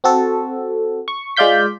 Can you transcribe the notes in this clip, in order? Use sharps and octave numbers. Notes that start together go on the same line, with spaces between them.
C4 F#4 A4
C#6
G#3 F4 D5 F5 G6 B6